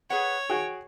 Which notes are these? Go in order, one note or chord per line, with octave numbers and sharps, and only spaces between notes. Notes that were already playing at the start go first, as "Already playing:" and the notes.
G#4 B4 C#5 F#5
F#4 G#4 G5